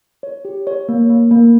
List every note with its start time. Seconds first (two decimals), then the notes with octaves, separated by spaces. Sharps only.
0.23 C#5
0.45 G4
0.67 C#5
0.89 A#3
1.10 A#3
1.31 A#3